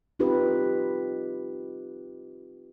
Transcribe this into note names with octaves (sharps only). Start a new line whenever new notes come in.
C4 D#4 F4 G4 B4